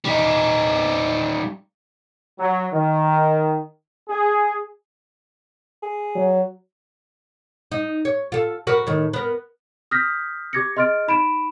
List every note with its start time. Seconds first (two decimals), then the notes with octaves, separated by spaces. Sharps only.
0.05 G3 D#4
2.39 F#3
2.72 D#3
4.09 G#4
5.83 G#4
6.15 F#3
7.72 D#4
8.05 C#5
8.32 F4 A4
8.67 F#4 A#4 B4
8.87 A2 D#3
9.13 B3 A#4
9.91 D#6 F6 G6 A#6 B6
10.53 G4 D6 G#6 A#6 C#7
10.76 G#4 D#5 C6 F6 A6 D7
11.08 D#4 B5 D7 E7